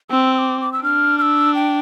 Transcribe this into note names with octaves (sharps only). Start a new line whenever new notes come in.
C4 E6
E6
D6
D6
E6
D4 F6
F6
E6
G5